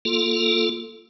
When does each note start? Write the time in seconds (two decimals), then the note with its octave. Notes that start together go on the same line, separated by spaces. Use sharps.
0.05 A#3 F4 A4